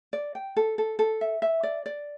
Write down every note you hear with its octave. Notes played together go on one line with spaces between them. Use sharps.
D5
G5
A4
A4
A4
E5
E5
D5
D5